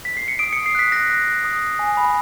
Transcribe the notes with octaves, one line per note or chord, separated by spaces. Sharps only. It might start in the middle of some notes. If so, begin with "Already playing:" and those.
B6
C7
C#7
D#6 D7
C#7
D#6
C7
F#6 B6
F#6 A#6
F#6
F#6
D#6
F#6
G#5
B5